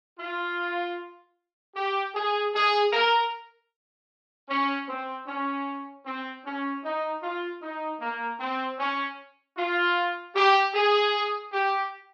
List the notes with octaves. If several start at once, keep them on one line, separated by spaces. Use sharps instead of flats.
F4
G4
G#4
G#4
A#4
C#4
C4
C#4
C4
C#4
D#4
F4
D#4
A#3
C4
C#4
F4
G4
G#4
G4